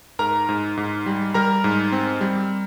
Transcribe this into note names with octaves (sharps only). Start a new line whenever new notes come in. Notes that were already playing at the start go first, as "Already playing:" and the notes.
G#2 A#4 A#5
G#2
G#2
G3
G3 A#4 A#5
G#2
C4
G3